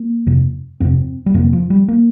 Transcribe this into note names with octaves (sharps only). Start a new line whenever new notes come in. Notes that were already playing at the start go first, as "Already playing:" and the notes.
Already playing: A#3
F2 C3
F2 C3 C4
G3
F2 C3 A#3
F3
G3
A#3